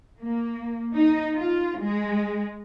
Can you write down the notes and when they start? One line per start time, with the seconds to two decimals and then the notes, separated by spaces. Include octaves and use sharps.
0.20 A#3
0.94 D#4
1.36 F4
1.81 G#3